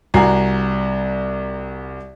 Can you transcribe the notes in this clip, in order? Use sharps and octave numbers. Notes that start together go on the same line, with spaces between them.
C2 F#4 G#5 A#5 C7